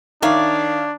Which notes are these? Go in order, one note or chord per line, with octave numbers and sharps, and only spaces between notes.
D#3 D4 C#5 D5 E5 F5